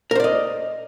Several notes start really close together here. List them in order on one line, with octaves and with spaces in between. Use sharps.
A#4 C5 D5 D#5